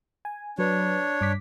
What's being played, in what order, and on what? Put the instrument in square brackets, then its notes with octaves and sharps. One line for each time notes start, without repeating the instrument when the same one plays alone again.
[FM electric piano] G#5
[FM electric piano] F#3 B4 [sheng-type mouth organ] D4 C#5
[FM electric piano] G2 D6 B6